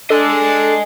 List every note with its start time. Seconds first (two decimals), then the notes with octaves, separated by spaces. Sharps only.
0.10 D4 A4 D#5 G#5